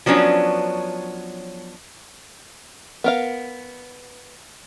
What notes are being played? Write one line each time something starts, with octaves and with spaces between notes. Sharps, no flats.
F3 F#3 B3 C#4 D4
B3 A#4 F5